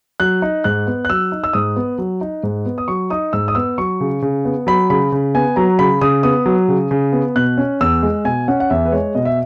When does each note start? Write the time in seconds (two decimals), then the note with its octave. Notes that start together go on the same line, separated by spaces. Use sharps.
0.20 F#3 F#6
0.42 D#4
0.64 G#2 F#6
0.87 B3
1.05 F#6
1.09 F#3 E6
1.32 D#4
1.44 E6
1.53 G#2 D#6
1.76 B3
1.98 F#3
2.21 D#4
2.43 G#2
2.66 B3
2.78 D#6
2.88 F#3 C#6
3.10 D#4 D#6
3.33 G#2 E6
3.48 D#6
3.55 B3 E6
3.78 F#3 C#6
4.00 C#3
4.22 C#3
4.45 B3
4.67 F#3 B5
4.90 C#3 B5
5.12 C#3
5.35 B3 G#5
5.56 F#3 A#5
5.79 C#3 B5
6.01 C#3 D#6
6.23 B3 D#6
6.46 F#3
6.68 C#3
6.91 C#3
7.13 B3
7.36 B2 F#6
7.58 C#4
7.81 E2 E6
8.03 G#3
8.25 B2 G#5
8.48 C#4 F#5
8.60 F#5
8.70 E2 E5
8.86 B4
8.92 G#3 C#5
9.15 B2 D#5
9.25 E5